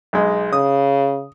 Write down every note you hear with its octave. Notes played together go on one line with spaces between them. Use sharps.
B1 G#3
C#3 D#6